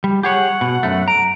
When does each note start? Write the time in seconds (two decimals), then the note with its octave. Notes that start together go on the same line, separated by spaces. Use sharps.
0.04 G3
0.23 G4 G#4 C#5 F#5
0.61 B2
0.83 F#2 A3
1.08 A#5 D7